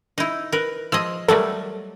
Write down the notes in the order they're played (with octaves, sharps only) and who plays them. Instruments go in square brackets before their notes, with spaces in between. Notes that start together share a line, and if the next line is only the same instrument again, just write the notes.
[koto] D#4 E4
A#4 B4
[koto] F3 G#4 D#5 [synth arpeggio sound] E6
[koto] F#3 G3 A3 [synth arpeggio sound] A4 A#4